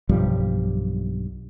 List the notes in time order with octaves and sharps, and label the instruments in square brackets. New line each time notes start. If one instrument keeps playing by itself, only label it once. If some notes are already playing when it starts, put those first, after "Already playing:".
[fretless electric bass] B1 G2 F3 G3